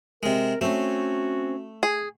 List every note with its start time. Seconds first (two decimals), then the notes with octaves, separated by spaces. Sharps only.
0.23 C3 G#3 A#4
0.61 A3 C4 C#4 F#4
1.83 G#4